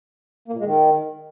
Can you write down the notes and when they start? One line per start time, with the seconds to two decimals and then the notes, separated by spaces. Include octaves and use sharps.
0.48 A#3
0.54 A#2
0.59 G#3
0.65 D#3